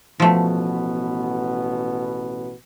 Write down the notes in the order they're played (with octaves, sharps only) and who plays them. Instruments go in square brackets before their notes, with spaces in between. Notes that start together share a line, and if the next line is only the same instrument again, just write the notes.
[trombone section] A1 B2 B3 [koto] F3 A3